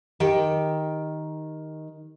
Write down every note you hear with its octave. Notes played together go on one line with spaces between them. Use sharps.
D#3 G4 G5